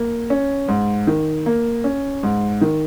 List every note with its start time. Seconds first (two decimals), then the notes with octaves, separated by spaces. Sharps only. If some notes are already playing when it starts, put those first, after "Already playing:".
Already playing: A#3
0.30 C#4
0.68 G#2
1.07 D#3
1.46 A#3
1.84 C#4
2.23 G#2
2.61 D#3